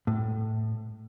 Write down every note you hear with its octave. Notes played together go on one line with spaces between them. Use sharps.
A2